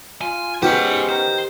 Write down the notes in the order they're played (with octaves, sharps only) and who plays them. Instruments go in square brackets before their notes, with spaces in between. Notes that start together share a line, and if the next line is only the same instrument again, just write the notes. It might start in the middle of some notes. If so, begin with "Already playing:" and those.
[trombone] F4 [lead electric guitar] G#5
[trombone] G#3 [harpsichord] B3 C#4 [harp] G4 [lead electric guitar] C5 F#5
[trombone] D#3 [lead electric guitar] C5